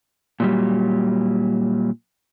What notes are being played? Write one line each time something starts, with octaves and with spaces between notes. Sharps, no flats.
A#2 F#3 G3